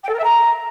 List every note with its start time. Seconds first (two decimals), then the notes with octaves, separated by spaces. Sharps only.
0.03 G5
0.08 A4
0.13 A#4
0.18 E5
0.23 A#5